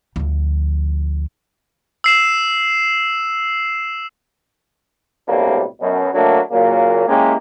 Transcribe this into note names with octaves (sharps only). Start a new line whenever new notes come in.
D2 F3
E6 C7 E7
B1 A2 C3 G3 A#3 D4
F#2 B2
F#3 A3 A#3 D4
A#2 C#3 F#3 A#3
G#3 A#3 C#4 E4 G4